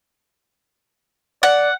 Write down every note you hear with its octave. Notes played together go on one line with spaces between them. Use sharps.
D5 F#5